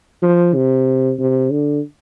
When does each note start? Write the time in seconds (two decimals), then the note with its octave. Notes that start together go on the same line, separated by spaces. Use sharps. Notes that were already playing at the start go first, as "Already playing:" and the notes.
0.22 F3
0.55 C3
1.19 C3
1.51 D3